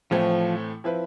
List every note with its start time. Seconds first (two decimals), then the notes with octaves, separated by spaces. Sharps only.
0.11 A2 E3 F3 A3 C4
0.84 F3 C4 E4 B4